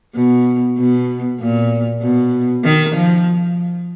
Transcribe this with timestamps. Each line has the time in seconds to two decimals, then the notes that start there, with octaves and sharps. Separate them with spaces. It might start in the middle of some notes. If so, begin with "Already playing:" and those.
0.15 B2
0.77 B2
1.40 A#2
2.01 B2
2.64 D#3
2.96 F3